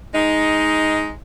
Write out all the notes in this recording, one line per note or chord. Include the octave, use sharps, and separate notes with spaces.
G#3 D#4